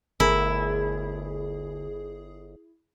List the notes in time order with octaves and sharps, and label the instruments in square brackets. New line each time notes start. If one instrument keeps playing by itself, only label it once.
[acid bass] G1 [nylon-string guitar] D2 A#4 [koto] E4 [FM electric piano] G#4